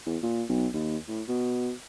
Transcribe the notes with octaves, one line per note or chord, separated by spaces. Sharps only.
E2
A#2
B1
D#2
A2
B2